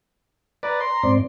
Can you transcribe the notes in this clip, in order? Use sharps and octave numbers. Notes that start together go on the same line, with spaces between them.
B4 D5 A#5
C6
G#2 C4 D5